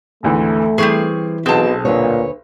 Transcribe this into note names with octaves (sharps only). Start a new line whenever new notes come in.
G#1 D2 E3 A3
E3 G3 C4 G#4 C#6
B1 B2 C4 G#4 A5
D2 A#2 B4 C#5